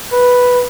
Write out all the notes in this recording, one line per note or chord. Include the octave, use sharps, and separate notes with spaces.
B4